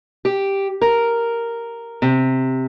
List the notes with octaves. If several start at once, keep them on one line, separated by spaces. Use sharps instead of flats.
G4
A#4
C3